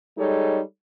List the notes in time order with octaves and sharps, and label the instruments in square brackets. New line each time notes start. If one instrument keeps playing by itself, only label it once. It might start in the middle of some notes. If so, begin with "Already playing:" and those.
[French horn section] G3 G#3 D#4 A4 C#5